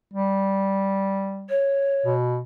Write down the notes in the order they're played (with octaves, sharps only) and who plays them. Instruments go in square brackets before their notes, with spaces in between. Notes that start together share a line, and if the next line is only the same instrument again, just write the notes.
[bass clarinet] G3
[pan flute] C#5
[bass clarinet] B2